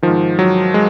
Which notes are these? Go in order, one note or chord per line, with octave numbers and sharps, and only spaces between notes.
G#2 D#3 F3
F#3
G#3